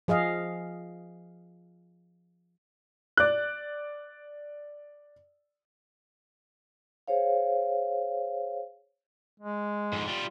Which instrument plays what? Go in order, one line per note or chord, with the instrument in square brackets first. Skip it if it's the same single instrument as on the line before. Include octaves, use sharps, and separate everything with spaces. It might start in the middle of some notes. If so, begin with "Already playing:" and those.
[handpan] F3 G#4 D#5 F5
[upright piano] D5 F#6
[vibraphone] G#4 C5 C#5 F5
[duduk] G#3
[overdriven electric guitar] F2 G#2
G3 F4